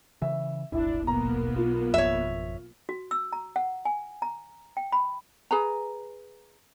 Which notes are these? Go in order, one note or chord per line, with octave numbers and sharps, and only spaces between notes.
C#3 E3 E5
D#1 G#1 G#2 D4 E4
B1 A#3 B3 A#5
F4
G#1 F2 C#5 E5
F#4
E6
A#5
F#5
G#5
A#5
G5
B5
G#4 B4 A#5